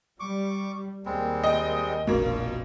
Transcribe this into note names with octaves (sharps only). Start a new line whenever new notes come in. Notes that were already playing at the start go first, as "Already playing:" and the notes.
G3 C#6 D6
D#2 G3 G#3 A#3 C4
D#5 G5
F1 A#1 B2 A#3 F4